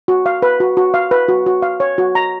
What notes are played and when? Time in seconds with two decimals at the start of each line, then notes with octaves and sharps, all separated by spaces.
0.08 F#4
0.26 F5
0.42 B4
0.60 F#4
0.77 F#4
0.94 F5
1.11 B4
1.28 F#4
1.46 F#4
1.62 F5
1.80 C#5
1.98 F#4
2.15 A#5